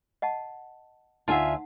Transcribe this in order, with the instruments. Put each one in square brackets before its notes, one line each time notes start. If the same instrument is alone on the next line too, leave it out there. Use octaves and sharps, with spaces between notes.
[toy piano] D#5 F#5 A5
[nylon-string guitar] D2 G#5 [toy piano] D#4 F#5 [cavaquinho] F4 E5